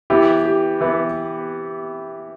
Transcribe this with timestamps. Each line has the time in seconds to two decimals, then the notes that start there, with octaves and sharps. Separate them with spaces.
0.10 E3 B3 E4 G4
0.46 G4
0.81 E3 B3 E4